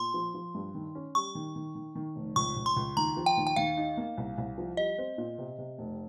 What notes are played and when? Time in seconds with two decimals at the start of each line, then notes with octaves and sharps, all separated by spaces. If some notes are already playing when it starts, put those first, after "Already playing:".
Already playing: A#2 C6
0.14 F3
0.34 F3
0.54 G2
0.75 D#3
0.95 C#4
1.15 G3 C#6
1.35 D#3
1.56 D#3
1.75 D#3
1.95 D#3
2.16 F1
2.36 C#2 C#6
2.56 C#2
2.66 C6
2.76 C#2
2.97 D#2 A#5
3.17 F3
3.26 G5
3.37 D#2
3.47 G5
3.56 D#2 F5
3.77 D#4
3.97 A#3
4.18 C2
4.38 C2
4.58 F3
4.77 G3 D#5
4.98 C4
5.18 A#2
5.38 C3
5.58 C3
5.79 F1